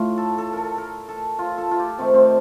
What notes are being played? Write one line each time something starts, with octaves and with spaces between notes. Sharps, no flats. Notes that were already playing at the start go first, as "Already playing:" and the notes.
Already playing: A2 A3 F4
A4
A4
A4 A#4
A#4
A4
F4
A4
F4
G4
C3 D#3 A3 C4
C4